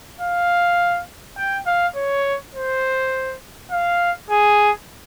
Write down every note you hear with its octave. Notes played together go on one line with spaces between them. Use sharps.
F5
G5
F5
C#5
C5
F5
G#4